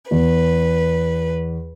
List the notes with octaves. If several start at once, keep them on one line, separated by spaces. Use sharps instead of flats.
E2 B4